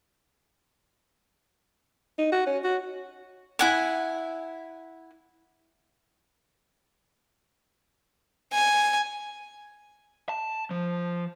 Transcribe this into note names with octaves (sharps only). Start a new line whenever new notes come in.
D#4
F#4
C#4
F#4
E4 F#5 G#5
G#5
A5
F3